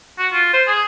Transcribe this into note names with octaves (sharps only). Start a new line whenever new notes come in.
F#4
F4
C5
G#4